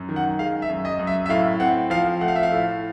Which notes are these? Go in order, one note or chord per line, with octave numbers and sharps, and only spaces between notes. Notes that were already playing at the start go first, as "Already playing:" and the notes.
Already playing: F#2
D#3
F#5
G#3 F5
E5
F#2
D#5
F#2
E5
E5
A2 F5
C4 F#5
F3 F5
A3 F#5
F5
E5
F5
A2